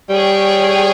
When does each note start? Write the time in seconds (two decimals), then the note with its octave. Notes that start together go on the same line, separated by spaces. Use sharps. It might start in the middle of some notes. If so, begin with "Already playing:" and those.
0.10 G3 G#4 C#5 G5